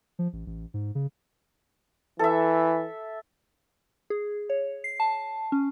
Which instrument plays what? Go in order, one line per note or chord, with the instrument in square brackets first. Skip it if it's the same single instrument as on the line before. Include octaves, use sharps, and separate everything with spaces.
[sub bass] F3
A1
A1
G#2
C#3
[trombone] E3 [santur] A4 E5
[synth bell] G#4
C#5
C7
A5
C#4